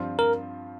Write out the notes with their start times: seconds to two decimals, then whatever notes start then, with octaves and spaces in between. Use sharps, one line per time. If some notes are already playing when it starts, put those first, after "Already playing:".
Already playing: G2 F3 C4 F4
0.19 A#4